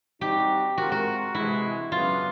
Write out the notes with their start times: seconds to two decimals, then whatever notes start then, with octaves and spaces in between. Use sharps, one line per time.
0.21 G3 C4 D#4 F#4 G4
0.78 G#3 C4 F4 F#4 A#4
0.92 F#4
1.34 C3 E3 G#3 E4
1.91 F#2 C#3 F#3 B3 D4 F4